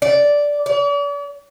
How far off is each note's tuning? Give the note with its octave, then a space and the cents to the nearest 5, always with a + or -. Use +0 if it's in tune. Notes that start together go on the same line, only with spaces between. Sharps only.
D5 -10
D5 -45